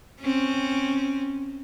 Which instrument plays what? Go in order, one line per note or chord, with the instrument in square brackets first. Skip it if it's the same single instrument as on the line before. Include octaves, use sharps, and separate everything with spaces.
[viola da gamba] C4 C#4